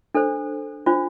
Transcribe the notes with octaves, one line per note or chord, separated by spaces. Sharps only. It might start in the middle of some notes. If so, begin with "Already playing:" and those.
D4 A4 C5
D4 F4 C5